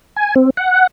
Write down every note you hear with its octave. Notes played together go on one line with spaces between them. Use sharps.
G#5
C4
F#5